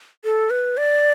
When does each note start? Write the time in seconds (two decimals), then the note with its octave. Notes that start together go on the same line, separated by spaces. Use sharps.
0.25 A4
0.50 B4
0.77 D5